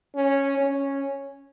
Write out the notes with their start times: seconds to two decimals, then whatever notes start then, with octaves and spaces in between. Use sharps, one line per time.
0.15 C#4
0.58 C#4